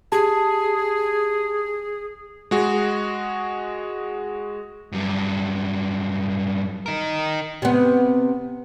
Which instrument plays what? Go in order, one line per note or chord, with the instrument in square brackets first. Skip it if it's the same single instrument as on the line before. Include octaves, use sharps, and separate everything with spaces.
[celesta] G4 A5 [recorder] G#4
[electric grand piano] G#3 F#4 G#4
[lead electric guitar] G2 F#3
D#4 A#4
[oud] C3 B3